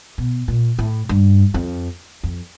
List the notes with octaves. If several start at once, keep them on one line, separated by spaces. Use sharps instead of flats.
B2
A#2
A2
G2
F2
F2